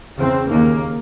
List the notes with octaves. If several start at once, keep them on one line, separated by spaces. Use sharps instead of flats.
E2 C#3 C4
D#2 C#3 A#3